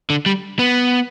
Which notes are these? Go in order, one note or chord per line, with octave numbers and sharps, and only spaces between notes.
D3
G3
B3